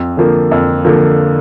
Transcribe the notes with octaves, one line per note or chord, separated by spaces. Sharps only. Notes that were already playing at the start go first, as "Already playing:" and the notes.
Already playing: F2
D3 F3 A#3
F2
D3 F3 A#3